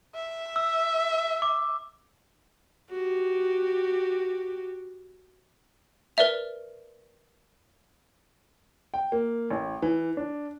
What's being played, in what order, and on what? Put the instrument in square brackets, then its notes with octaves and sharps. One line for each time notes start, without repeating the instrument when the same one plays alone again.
[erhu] E5
[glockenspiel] E6
D6
[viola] F#4 G4
[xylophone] A#4 B4 D5 E5 F7
[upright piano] G5
A#3
A1
E3
D4